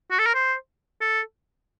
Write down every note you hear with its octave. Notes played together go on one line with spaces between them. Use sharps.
F#4
A4
A#4
C5
A4